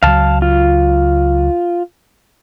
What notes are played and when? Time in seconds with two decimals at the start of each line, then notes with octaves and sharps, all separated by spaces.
0.03 C#2 F#3 F5 A5
0.42 F4